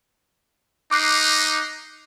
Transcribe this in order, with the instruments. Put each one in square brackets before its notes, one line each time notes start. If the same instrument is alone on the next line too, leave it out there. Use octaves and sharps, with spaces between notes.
[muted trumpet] D#4 [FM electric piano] D6 F#6 C7